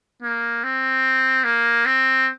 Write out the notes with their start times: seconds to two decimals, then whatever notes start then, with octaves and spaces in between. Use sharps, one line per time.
0.22 A#3
0.64 C4
1.44 A#3
1.86 C4